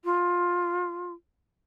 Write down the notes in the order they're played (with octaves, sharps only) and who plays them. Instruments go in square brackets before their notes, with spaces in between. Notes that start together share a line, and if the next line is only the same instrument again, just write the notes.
[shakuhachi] F4